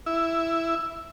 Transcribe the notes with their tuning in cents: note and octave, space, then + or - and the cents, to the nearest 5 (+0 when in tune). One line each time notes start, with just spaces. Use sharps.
E4 +5